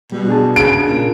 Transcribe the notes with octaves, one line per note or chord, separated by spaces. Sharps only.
B2 G3
D4 G#4 A5
C#3 D7
A#2